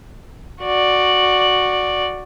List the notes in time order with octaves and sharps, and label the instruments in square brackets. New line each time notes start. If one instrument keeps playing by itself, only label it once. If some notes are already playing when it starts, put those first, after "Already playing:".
[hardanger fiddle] F#4 D5